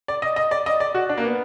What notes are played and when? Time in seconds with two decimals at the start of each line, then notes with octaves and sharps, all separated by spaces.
0.08 D5
0.22 D#5
0.36 D#5
0.51 D5
0.66 D#5
0.80 D5
0.95 F#4
1.09 D4
1.18 A#3
1.24 B3